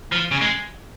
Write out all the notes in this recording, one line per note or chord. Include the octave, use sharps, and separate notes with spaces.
F3
C#3
G#3